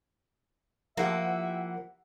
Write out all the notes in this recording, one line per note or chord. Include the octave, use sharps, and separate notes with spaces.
F3 A#3 E4 G4 E5 F#5